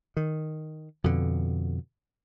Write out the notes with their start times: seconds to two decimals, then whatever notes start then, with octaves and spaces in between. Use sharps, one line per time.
0.17 D#3
1.04 F2 B2 D3